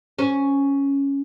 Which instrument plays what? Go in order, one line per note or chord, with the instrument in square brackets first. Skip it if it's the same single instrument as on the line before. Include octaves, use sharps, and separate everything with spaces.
[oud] C#4